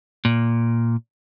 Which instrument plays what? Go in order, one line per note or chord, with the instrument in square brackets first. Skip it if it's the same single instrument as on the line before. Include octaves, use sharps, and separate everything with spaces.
[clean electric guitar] A#2